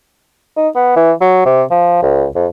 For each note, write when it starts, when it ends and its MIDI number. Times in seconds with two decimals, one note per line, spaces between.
0.57 0.68 63
0.75 0.91 59
0.96 1.12 52
1.21 1.42 54
1.45 1.63 48
1.71 1.98 53
2.02 2.26 37
2.35 2.47 41